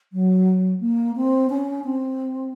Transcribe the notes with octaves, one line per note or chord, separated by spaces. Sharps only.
F#3
A#3
C4
C#4
C4